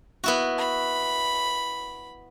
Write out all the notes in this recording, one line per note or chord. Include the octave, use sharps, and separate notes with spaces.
B3 E4 F#4
B5